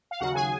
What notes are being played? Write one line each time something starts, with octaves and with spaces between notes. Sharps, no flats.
F5
D#2 C#3 F#3 F#4 F#5
G#4 G#5